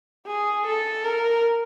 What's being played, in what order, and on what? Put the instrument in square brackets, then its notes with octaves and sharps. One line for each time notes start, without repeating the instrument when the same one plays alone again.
[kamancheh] G#4
A4
A#4